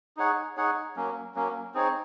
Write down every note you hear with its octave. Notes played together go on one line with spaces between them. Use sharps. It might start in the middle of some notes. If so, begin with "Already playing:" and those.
D#4 G#4 C#5 F#5
D#4 G#4 C#5 F#5
F#3 A#3 C#4
F#3 A#3 C#4
C4 D#4 G#4 C#5